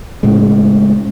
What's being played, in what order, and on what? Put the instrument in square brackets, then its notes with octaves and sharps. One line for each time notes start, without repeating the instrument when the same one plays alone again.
[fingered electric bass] A2 C#3 G#3